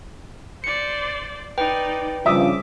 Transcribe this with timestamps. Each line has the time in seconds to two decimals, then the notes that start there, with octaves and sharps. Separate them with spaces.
0.64 C5 D5 C#7
1.58 D#4 B4 D5 G5
2.26 G2 C#3 F3 E5 D6 D#6